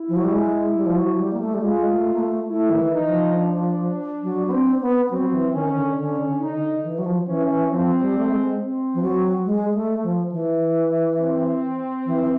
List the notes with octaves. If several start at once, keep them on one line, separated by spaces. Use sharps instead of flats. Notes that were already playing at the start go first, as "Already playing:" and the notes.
Already playing: E4
F3
F#3
G3
G#3
G3
F3
F#3
G3
A#3
A3
G3
G#3 F4
A3
A#3
A3
A3 E4
D#3
E3
D#4
F3
D4
F#3
B3
C4
B3
F#3 C4
E3
D#3 C#4
D3
D3 C#4
D3
D#4
D3
E3
F#3
F3
E3 C#4
E3
F3 C4
G3
A3
G#3
C4
F3
F#3
G#3
A3
F3
E3
C4
E3
E3